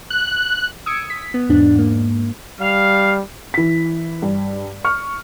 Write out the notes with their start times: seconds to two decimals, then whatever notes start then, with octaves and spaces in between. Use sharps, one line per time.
0.10 F#6
0.86 D#6 E6 G#6 C#7 D7
1.10 B6
1.34 B3
1.49 E2 G#2 D4
1.75 G#2 A#3
2.60 G3 F5
3.54 E3 B6
4.22 G2
4.84 C#6 F6